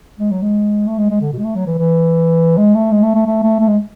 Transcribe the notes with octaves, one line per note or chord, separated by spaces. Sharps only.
G#3
F#3
G#3
A3
G#3
G#3
D3
B2
G#3
A3
F#3
E3
E3
G#3
A3
G#3
A3
A3
A3
A3
A3
G#3